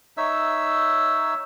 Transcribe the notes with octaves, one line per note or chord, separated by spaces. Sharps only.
D#4 C#5 E5 E6